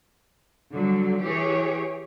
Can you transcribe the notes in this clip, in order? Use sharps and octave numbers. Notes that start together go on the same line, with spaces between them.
D3 F#3 G3
E3 G4 G#4 C#5